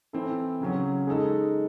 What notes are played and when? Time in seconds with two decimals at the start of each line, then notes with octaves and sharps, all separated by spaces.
0.13 E3 C4 E4 A4
0.60 C#3 F#3 C#4
1.07 G#3 D#4 A4